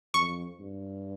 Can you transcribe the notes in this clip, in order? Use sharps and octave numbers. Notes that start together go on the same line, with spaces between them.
F2 C#6
G2